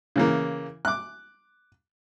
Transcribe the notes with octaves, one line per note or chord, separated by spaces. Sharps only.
C#3 E3 A#3
D6 F#6